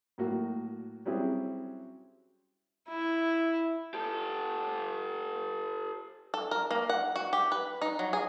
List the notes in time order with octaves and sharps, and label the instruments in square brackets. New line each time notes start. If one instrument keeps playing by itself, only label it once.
[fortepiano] A2 F#3 A#3 F#4
F#3 G3 C4 C#4 E4 G#4
[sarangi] E4
[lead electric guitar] G4 A4
[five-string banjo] A4
A#4
A#3
F#5
F#4
G4
B4
D#4
F#3
G#4